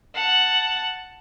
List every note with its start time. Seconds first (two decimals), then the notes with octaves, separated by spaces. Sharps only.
0.14 F#5 A5